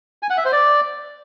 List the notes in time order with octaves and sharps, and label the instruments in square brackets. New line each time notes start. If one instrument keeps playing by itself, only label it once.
[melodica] G#5
F#5
E5
C5
D5